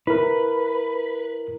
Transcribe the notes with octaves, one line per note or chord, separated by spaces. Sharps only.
E4 A#4 B4